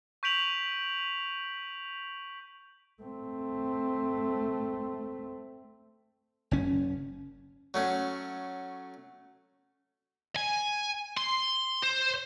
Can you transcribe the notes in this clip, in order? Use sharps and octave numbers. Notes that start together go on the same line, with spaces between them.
C#6 G6 B6 D7 F7 F#7
A3 C4
F#1 C#4
F#3 A3 C#4
G#5
C6
C5